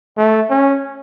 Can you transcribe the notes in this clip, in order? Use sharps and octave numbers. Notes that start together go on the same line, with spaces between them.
A3
C#4